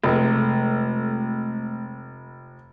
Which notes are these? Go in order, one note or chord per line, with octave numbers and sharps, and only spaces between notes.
F1 G#3 A3